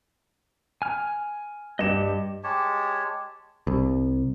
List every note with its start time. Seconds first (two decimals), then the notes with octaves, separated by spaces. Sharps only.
0.82 G#5 F6
1.79 G2 G4 D#5 E7
2.44 G#3 G4 C#5 A5
3.67 C2